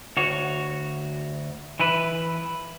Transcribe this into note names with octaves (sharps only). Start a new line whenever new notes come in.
D2 F#4 C#5
E3 E4 B4